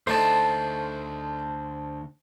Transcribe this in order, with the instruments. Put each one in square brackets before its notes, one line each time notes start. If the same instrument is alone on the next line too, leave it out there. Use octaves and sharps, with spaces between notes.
[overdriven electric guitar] D2 [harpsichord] A3 D4 D#4 [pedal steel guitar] C5 A5